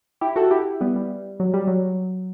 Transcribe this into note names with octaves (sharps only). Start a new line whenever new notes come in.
E4 G4
F#4 A4
E4 G4
G3 B3
G3
F#3
G3
F#3